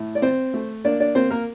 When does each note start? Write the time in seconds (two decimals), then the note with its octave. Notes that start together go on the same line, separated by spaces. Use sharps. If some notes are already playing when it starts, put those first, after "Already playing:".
Already playing: A2
0.15 D5
0.22 C4 C5
0.54 A3
0.85 A#3 D4 D5
1.00 D4 D5
1.15 A#3 C4 C5
1.31 A#3 A#4